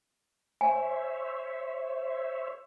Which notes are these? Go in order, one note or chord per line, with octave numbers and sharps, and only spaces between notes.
C5 C#5 E5 G#5